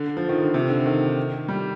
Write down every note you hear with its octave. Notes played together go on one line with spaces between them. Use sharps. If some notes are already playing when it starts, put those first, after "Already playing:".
Already playing: D3
F3
D#3
D3
C3
D3
D#3
G3